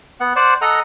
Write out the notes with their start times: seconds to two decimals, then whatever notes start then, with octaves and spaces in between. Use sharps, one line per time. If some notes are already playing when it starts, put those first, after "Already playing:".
0.20 B3 F#5
0.36 C5 D5 F#5
0.62 A4 D#5 F#5 A#5